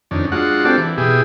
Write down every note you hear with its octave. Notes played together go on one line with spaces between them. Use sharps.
F2 D#3 C#4 D4
G#3 D4 F4 F#4 F#5
C4 D4 F4 G4 A4 D5
E3
B2 E4 G4 G#4